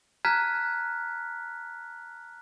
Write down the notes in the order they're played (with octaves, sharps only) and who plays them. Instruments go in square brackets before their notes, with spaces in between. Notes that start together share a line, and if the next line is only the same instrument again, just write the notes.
[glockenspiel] A5 A#5 F6 F#6 G#6 B6